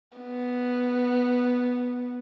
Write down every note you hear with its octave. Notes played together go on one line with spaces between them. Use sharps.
B3